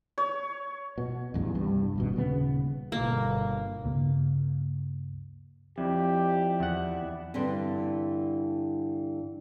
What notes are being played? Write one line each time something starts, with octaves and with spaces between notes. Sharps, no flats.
C#5
B2
A1 E2 G2
C2 G2
D#1 G#1 B2
D#1 C#3 B3
G1 B2 A#3
C#2 G2 C#3 A#3
F2 E4 G4 D5 E5
E2 F#5
G2 D3 E3 G3 C4